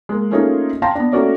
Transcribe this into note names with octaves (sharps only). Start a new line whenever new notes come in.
G#3 A#3
A3 A#3 C#4 D#4 F4 G#4
F5 G5 A5 A#5 C6 A#6
B3 D4
A3 A#3 C#4 F#4 A#4 D5